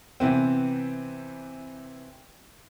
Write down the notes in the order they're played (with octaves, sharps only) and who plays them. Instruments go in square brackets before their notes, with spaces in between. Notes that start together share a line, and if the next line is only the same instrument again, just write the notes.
[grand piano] C3 E3 B3 C4